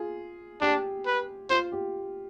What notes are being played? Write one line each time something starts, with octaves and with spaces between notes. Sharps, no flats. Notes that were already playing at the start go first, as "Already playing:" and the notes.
Already playing: F4 G#4
D4 G4
B4
F4 C5
G4